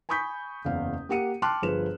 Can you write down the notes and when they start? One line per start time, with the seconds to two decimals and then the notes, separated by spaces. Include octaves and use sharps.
0.09 G#5 B5 C#6 D#6 G6 B6
0.65 F#1 E2 F5
1.09 A#3 G4 F#5 C#7 D#7
1.42 G5 A5 C6 D6 F6 F#6
1.62 G1 F3 G#4 B4 C5 E7